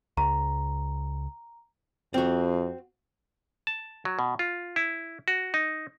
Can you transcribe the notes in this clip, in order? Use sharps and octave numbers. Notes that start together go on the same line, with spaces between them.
C#2 A#5
F2 C4 F#4
A5
F#3
B2
F4
E4
F#4
D#4